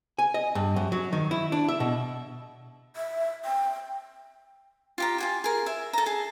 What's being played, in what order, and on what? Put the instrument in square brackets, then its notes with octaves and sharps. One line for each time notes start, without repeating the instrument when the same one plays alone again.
[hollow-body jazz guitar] G#5
D#5
G2
F#2
F#3
D#3
E4
D4
E5
B2
[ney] E5
G5
[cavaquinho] F4 G4 A#5
F4 F#4 G#5
G#4 A#4
E5
A4 A#5
G#4 A5